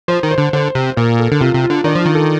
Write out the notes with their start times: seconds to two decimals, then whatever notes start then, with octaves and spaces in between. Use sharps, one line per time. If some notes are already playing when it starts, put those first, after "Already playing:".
0.08 F3 C5
0.23 D#3
0.31 C5
0.38 D3
0.53 D3 C5
0.75 C3
0.97 A#2 A#4
1.19 A4
1.32 D3
1.40 C3 F4
1.55 C3
1.63 F4
1.70 D3
1.84 D#3 D4
1.95 F3 F4
2.05 D#3
2.15 A4